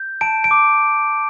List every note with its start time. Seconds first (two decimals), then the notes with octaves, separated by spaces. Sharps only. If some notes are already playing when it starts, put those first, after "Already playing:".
Already playing: G6
0.21 A5 D7
0.44 D7
0.51 D6